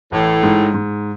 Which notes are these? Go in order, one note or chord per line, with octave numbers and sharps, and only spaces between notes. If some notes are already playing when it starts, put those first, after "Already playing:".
A1 A2
G#2
G#2